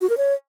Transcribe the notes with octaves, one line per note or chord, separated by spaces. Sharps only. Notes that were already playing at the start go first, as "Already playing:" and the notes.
F#4
A#4
C#5